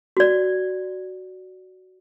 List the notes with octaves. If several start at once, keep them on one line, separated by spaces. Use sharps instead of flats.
F#4 D5